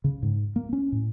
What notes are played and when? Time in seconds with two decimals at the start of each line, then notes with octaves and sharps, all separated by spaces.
0.04 C#3
0.23 G#2
0.56 A#3
0.73 C#4
0.92 A2